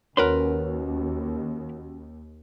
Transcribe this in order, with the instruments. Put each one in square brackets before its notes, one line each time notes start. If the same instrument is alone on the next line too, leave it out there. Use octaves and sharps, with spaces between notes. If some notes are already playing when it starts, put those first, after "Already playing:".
[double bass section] D#2 [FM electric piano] C#4 F#4 [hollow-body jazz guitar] A#4 B4 C6